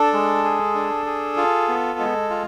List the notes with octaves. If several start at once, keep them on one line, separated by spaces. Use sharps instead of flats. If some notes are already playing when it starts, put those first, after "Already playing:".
Already playing: D4 A4
G#3
G#4
D4
G#4
F4
B3
G#3
F4